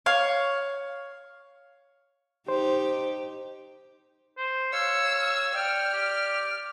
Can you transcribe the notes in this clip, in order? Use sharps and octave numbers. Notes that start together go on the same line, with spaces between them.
C#5 F5
D#4 G4 C5
C5
C#5 F5 E6
D5 G5 F6
G4